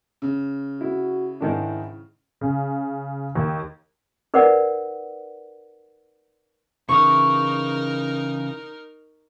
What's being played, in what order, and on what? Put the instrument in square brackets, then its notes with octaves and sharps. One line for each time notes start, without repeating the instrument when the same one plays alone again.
[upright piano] C#3
[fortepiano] E4 [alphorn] F#4
[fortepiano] G#2 D#3 D4 [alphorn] E4
[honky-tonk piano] C#3
D#2
[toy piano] D#4 A#4 B4 D5 F#5
[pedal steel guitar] C#3 E3 D#6 [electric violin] D#4 A#4 [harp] C#6